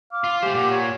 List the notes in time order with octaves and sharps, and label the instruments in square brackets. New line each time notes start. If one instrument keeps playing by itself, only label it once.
[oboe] F5 [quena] D6
[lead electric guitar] F4
[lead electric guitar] A3 C5 [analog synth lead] G4 [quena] G#5
[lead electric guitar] A#2 [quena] F#5 [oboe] D6
[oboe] C#5